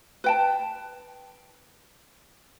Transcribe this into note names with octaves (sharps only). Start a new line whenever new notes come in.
B4 G5 A5